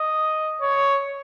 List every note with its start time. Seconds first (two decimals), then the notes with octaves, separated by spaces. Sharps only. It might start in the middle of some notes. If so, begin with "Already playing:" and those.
Already playing: D#5
0.62 C#5